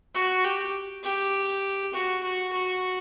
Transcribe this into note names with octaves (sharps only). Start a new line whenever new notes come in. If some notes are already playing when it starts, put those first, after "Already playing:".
F#4
G4
G4
F#4
F#4
F#4